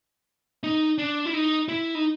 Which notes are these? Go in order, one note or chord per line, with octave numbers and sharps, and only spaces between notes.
D#4
D4
E4
D#4
E4
D#4